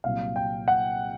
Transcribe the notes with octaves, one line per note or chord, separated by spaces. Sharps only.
C2 A#2 F#3 F5
G5
F#5